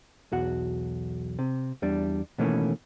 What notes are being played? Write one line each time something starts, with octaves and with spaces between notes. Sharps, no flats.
B1 E2 F#4 F#5
C3
E2 G3 D4
B2 D#3 E3 A3 A#3 C#4